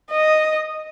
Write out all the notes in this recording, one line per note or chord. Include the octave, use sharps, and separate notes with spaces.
D#5